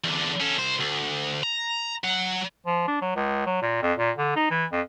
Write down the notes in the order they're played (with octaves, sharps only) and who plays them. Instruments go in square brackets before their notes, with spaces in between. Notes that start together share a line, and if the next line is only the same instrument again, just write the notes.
[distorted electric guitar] E2 D3
C#4 A4
C2 C5
D2
A#5
F#3 F#5
[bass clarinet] F3
D4
F#3
C#2
F#3
A#2
F2
A#2
D3
D#4
E3
F2